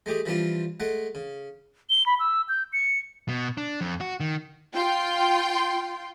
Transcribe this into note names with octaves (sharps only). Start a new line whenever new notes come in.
G#3 A3 G4 G#4
E3 F3 G3 C4 D4 F4
G#3 A3 F#5
C#3
G7
B5
E6
G6
C#7
B2
D4
F2
F#4
D#3
F4 G5 C6